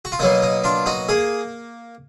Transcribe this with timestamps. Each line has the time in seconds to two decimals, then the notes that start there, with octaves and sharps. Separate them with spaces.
0.05 F#4
0.12 F4
0.19 B2 F#3 A#3 D#4
0.42 D#4
0.64 D4 F4
0.86 D#4 F#4
1.09 A#3 G#4